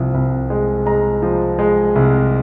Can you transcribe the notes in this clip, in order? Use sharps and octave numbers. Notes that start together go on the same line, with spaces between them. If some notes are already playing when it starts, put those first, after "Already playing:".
Already playing: C2 F3
C2
G#3
G#3 A#5
F3
G#3
C2